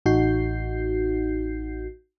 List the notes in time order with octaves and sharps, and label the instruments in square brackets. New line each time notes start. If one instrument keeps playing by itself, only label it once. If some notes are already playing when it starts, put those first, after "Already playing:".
[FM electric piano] A1 D#4 F#4 G6 C7